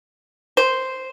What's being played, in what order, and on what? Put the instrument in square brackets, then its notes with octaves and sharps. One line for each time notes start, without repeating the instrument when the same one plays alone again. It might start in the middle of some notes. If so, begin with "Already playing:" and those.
[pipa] C5